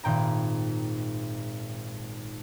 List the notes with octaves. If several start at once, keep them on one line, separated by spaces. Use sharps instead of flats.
G#1 A#2 G5 A#5